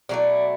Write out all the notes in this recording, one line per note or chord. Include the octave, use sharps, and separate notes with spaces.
B2 F#3 A3 E4 D5